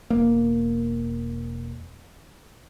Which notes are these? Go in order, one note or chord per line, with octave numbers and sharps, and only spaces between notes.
E1 A#3